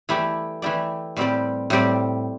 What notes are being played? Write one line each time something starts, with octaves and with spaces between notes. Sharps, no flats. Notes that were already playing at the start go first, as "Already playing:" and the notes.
E3 A3 E4 G4 D5
E3 A3 E4 G4 D5
A2 G3 C4 G4 D5
A2 G3 C4 G4 D5